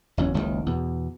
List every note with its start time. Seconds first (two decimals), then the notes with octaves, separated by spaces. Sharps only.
0.17 F#1 E2 F#3 C#4
0.34 F#1 C#2 A2 D#3
0.66 E2 B2